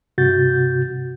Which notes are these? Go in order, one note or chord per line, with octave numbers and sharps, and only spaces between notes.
G2 C3 F#4 G6 A6